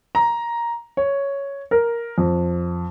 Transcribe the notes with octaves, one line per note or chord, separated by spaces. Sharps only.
A#5
C#5
A#4
F2